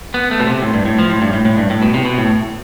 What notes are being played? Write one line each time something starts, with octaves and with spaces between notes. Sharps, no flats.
B3
A3
B2
C3
A2
G2
A2
F3
A2
G2
A2
A2
G2
A2
B2
C3
B2
A2